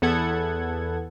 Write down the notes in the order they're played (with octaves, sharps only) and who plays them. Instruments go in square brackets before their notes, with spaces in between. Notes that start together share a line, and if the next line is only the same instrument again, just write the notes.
[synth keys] E2 B3 A4 F#5 G#6